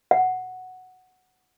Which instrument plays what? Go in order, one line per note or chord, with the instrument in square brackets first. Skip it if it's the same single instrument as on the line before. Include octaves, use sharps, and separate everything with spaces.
[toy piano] F#5